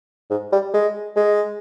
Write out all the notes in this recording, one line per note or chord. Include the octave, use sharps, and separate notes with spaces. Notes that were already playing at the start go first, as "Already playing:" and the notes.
G#2
G3
G#3
G#3